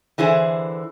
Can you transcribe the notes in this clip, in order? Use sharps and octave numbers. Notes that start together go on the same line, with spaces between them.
D3 E3 E4 G#4 C5